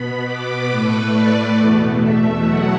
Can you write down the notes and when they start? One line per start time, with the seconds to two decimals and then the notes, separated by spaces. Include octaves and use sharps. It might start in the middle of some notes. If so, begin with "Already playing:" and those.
Already playing: B2 B3 B5
0.25 D6
0.69 A2 A3 B4
1.12 D5
1.55 E2 B2 A3
2.00 E5
2.43 B2 F#3 A3 F#5